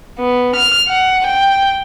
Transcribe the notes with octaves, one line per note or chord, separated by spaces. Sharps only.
B3
F6
F#5
G5